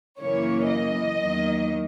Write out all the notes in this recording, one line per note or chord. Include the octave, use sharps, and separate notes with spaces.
F#2 C#3 E3 A#3 C#5
D#5
E2 D#3 F#3 A#3